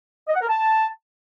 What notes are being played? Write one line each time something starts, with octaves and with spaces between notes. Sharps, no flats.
D#5
F#5
A#4
A5